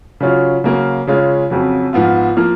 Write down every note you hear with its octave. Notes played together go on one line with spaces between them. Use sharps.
C#3 F#3 C#4 F4
C#3 F#3 A#3
C#3 G#3 C#4 F4
F2 C#3 F#3
G#2 F3 B3 F4
F3 A#3